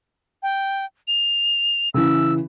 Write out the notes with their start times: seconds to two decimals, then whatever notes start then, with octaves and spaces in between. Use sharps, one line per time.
0.43 G5
1.08 F7
1.94 C#3 E3 E6